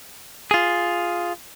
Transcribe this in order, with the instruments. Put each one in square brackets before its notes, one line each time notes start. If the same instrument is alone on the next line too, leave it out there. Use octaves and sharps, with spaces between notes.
[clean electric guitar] F4 G#4